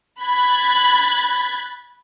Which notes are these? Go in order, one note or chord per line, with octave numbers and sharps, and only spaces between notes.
B5 F#6 G#6 A6